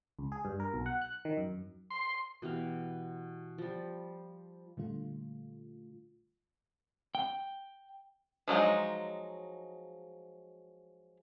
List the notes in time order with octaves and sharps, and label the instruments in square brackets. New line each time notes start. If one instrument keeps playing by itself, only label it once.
[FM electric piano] C#2
G#4
G2
A#4
B1
F#5
F#6
D#3
F#2
[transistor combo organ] C6
[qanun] B2 E3 G4 F5
F3 G3
[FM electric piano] A#2 D3 G3 A3 F4
[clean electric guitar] G5
[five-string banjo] F3 F#3 G#3 D#4